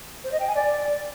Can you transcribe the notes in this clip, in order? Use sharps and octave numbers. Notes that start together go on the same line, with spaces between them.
C5
D#5
G5
G#5
D5